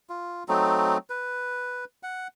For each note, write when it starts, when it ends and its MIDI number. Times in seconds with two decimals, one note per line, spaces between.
0.10 0.44 65
0.48 0.97 54
0.48 0.97 57
0.48 0.97 60
0.48 0.97 63
1.10 1.85 71
2.03 2.27 78